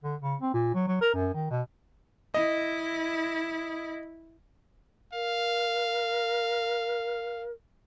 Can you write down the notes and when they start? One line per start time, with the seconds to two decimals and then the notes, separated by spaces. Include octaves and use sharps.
0.04 D3
0.22 C#3
0.42 C4
0.54 A#2
0.74 F#3
0.87 F#3
1.01 A#4
1.14 F#2
1.34 D#3
1.51 B2
2.34 E4 D#5
5.13 A#4 F5